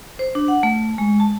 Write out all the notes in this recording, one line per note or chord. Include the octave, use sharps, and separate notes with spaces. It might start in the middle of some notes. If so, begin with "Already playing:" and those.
C5
D4
F#5
A3
G#3
A5